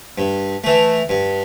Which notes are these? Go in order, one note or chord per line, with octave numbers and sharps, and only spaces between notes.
G2
E3 A3
G2